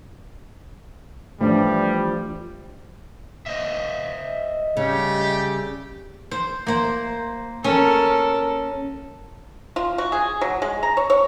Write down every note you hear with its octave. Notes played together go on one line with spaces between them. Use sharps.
E3 F3 G3 A3 D4
C5 D#5 E5
C#3 G3 A3 G4
C5
A#3 C5
C#4 A4 A#4
F4
F#4
G#4
F#3
G#3
A#5
C#5
C#5